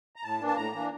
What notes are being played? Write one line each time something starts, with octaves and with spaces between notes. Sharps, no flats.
A#5
A2 A5
E3 A#3 D4
A5
A2 A#5
E3 A#3 D4